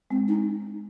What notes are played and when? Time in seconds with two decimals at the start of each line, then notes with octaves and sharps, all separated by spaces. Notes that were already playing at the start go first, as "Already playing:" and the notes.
0.10 G#3 C4
0.28 D#4